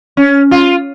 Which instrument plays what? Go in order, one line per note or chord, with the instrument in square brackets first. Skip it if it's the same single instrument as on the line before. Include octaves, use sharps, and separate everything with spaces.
[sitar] C#4
F4